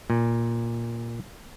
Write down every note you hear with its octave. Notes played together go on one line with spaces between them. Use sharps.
A#2